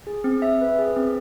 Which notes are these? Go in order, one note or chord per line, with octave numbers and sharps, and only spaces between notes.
G#4
C4
E5
B4
G#4
C4